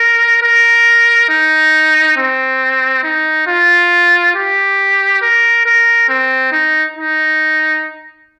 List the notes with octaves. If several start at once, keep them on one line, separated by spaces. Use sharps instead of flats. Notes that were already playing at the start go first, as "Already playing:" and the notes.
Already playing: A#4
A#4
D#4
C4
D#4
F4
G4
A#4
A#4
C4
D#4
D#4